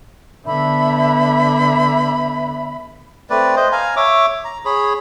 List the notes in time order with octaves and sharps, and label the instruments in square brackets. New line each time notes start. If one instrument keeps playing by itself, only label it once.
[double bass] D3 B3 [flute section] E5 B5
[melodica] A3 C4 B4 D5
C5 D#5
F5 G#5 A#5
C#5 E5 D6
A#5
G#4 C#5 B5